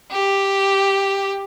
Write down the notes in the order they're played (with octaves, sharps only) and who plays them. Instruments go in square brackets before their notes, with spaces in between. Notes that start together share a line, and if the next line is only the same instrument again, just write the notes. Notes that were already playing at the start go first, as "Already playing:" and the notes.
[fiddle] G4